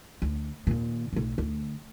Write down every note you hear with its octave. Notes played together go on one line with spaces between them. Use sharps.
D2
D#2 A#2
B1 A2
D2